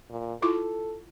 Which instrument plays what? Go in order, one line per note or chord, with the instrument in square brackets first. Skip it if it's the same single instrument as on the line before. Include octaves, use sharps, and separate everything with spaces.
[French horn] A#2
[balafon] E4 F4 D6 [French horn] A4